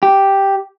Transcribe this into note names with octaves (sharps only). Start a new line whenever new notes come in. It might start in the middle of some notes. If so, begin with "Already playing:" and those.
G4